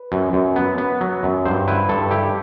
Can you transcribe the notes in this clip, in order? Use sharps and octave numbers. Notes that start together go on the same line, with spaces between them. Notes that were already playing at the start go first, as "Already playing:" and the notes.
Already playing: B4
F#2
F#2
B3
B3
F#3
F#2
G2 C5
E4 B4
G2 A4
E4 G4